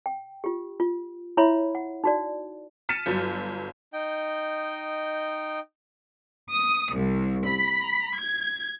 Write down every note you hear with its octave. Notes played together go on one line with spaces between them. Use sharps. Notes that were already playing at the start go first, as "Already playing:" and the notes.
G5
F4 G4
F4
E4 C#5 E5 B5 C6
F#5
D#4 F#4 D5
F6 A6 B6 C#7 D#7 E7
G1 F#3
D#4 D#5 G5 G6
D#6
C2
B5
G#6